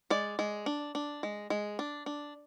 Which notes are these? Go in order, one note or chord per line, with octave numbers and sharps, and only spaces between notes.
G#3 D5
G#3
D4
D4
G#3
G#3
D4
D4